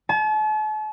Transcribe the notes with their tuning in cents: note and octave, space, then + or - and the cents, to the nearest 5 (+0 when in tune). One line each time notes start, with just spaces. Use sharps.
A5 -40